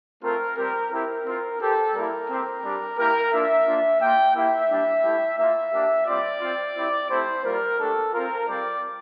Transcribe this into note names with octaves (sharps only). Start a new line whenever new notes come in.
A3 C4 F4 A#4
G3 C4 G4 A#4
C4 E4 G4 A#4
C4 F4
C4 G4 A4
G3 A#3 E4 A#4
C4 G4
G3 D4 G4
A#3 E4 G4 A#4
A#3 D4 F4 E5
A#3 D4 F4
A#3 F4 G5
A#3 E4 G4 E5
G3 D4 G4
A3 E4 G4
A#3 F4 E5
A#3 D4 G4
G3 C4 F4 D5
C4 F4
C4 E4 G4
A3 C4 E4 G4 C5
G3 A#3 F4 A#4
A3 D4 G4 A4
C4 F4 A#4
G3 C4 F4 D5